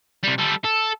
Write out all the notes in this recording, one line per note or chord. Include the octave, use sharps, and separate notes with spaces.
C3 G3
G3 A4
A4